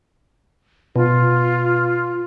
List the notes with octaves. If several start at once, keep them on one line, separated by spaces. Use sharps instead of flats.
B2 F4